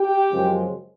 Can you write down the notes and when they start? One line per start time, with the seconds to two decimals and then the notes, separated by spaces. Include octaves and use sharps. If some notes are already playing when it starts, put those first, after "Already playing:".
Already playing: G4 G5
0.32 F#2 C#3 F3 G#3 C4